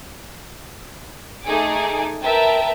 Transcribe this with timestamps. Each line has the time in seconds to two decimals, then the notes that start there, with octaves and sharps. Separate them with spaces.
1.45 A3 D#4 G#4 G#5 D6
2.22 A#4 B4 E5 G5 A5 A#5